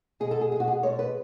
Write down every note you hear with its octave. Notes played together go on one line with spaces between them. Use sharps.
B2 G#3 G#4
A4
G#4
B2 G#3 F#4 G#4
G#4
B2 G#3 C#5
B4